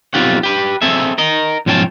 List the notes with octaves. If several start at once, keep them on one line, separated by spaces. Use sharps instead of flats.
B1 B2 C4 F4 G4 F#5
G4 B4
C4 G#4 A4 E5
A#4 D#5
B1 G#2 F3 C#4 G5 A5